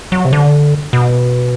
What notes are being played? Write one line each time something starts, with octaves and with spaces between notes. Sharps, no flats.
F#3
C3
D3
B2